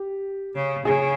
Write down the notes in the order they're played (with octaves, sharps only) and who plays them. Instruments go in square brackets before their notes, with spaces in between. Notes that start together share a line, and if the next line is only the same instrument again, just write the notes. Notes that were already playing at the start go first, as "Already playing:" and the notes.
Already playing: [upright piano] G4
[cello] C#3
[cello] C#3 [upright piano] G#4